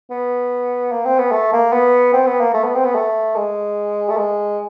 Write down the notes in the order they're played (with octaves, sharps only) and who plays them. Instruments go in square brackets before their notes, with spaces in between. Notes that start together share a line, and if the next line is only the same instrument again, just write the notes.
[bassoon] B3
A#3
C4
B3
A3
A#3
B3
C4
B3
A#3
A3
B3
C4
B3
A3
G#3
A3
G#3